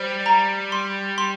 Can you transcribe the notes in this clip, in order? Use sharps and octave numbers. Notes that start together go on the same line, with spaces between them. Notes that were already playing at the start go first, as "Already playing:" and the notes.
Already playing: G3 C5
A#5
C6
C6